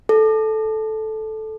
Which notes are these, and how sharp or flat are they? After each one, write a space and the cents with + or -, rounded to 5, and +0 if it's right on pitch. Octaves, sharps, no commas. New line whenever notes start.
A4 -10